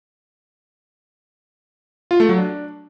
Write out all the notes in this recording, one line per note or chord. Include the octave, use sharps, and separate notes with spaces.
F4
A3
F#3
D4